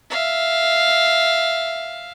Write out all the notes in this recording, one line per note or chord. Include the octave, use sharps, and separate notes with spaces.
E5 F5